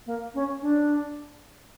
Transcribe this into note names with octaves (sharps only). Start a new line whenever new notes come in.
A#3
C#4
D4